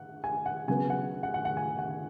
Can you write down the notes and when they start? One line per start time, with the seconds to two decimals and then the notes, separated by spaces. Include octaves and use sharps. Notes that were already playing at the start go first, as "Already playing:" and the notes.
Already playing: F#5
0.24 G#5
0.46 F#5
0.68 C#3 F#3 B3 G#5
0.90 F#5
1.23 F#5
1.34 F#5
1.45 F#5
1.57 G#5
1.79 F#5